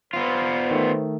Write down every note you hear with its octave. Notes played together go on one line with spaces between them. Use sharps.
B3 F4 B4 C5
D#3 A3